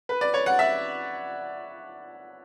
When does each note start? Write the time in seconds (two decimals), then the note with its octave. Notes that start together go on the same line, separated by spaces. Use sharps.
0.09 B4
0.21 D5
0.34 C#5
0.46 F#5
0.59 E5